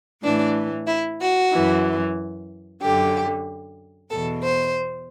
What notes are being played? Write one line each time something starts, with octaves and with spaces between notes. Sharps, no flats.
A2 E3 D4
E4
F#4
F#2 E3
F#2 D3 G4
E2 B2 A4
C5